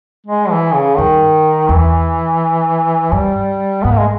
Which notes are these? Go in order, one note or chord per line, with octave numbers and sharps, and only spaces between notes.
G#3
E3
C#3
G2 D#3
E2 E3
G2 G3
G#2 B3
A#3
G#3